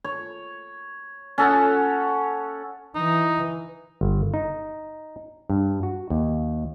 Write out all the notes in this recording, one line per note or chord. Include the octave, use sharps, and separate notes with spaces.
C#5
C#4 A4 F#5
E3 D#4
G1
D#4
G2
F#4
D#2